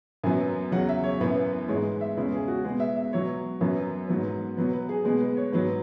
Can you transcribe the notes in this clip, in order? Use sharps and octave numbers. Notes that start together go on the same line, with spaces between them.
F#2 F#3 B3 G#5
E2 C#3 F#3 F#5
E5
C#5
F#2 E3 B3 B4
G#2 E3 G#3 B3 C#5
E5
E2 C#3 G#3 B4
G#4
F#4
B2 G#3 B3 G#4
E5
E5
B2 F#3 B3 C#5
F#2 F#3 B3 B4
G#2 F#3 B3
B2 F#3 B3 B4
B4
G#4
B2 G#3 B3 G#4
B4
C#5
G#2 F#3 B3 B4